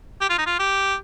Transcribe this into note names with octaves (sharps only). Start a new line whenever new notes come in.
G4
F4
D#4
F4
G4